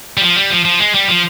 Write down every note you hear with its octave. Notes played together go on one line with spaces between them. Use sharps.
G3
F3
G3
F3
F3
G#3
G3
F3